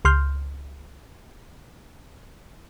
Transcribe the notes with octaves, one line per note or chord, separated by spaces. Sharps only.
C#2 C6 F6 G6